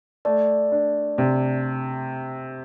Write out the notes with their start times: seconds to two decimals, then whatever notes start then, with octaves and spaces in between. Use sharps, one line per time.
0.25 A3 D5
0.72 D4
1.18 C3